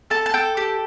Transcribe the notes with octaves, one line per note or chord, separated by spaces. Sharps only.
A4 A5
A5
A4 G5
G4